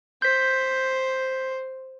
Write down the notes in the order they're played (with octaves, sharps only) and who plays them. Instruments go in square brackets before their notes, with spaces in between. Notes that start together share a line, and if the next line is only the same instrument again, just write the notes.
[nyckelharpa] C5 [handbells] G6 B6